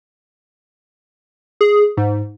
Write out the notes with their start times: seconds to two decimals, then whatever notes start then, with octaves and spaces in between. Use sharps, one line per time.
1.61 G#4
1.97 G#2